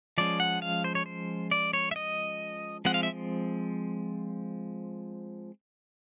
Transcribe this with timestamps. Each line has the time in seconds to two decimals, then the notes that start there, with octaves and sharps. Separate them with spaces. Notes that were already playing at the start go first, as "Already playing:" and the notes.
0.18 F3 G#3 C#4 D5
0.40 F#5
0.62 F5
0.84 C5
0.95 C#5
1.06 C5
1.51 D5
1.73 C#5
1.91 E5
1.96 D#5
2.85 F3 G#3 C4 F#5
2.94 F5
3.03 E5